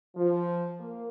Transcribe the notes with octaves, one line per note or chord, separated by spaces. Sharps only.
F3
A#3